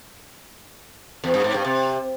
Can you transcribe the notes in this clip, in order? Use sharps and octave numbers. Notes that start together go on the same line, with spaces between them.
E2
G2
G#2
G2
C3